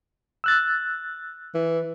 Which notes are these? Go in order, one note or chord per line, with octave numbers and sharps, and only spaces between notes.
E6 F#6 A6
E3